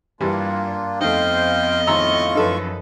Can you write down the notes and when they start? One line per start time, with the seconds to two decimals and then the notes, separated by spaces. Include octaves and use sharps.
0.21 G2 E3 G3 A#3 D4 F4
1.01 F2 A3 B3 D#4 C5 D#5 F5 G5
1.87 G#1 A2 F4 A#5 C#6 E6
2.35 F#2 F3 D#4 A4 B4